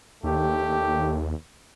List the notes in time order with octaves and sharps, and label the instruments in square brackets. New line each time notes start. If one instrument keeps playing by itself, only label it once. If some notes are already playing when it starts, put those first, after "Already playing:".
[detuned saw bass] D#2 [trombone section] D3 A3 G4